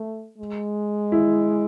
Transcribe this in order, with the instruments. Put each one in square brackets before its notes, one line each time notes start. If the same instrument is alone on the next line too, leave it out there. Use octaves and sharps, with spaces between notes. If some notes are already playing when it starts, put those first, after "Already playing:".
Already playing: [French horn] A3
G#3
[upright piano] E4